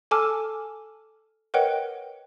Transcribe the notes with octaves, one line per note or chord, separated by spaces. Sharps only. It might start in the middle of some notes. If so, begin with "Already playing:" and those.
A4 G#5 A5 D6 E6 F6
A#4 B4 C#5 D#5 F#5 G5